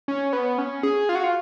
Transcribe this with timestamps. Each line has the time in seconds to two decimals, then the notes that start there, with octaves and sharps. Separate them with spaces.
0.08 C#4
0.33 B3
0.58 C#4
0.83 G#4
1.09 F4
1.15 F#4
1.24 F4